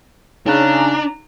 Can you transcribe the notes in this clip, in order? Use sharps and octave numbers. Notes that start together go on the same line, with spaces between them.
C#3 D4 D#4 A#5 F#6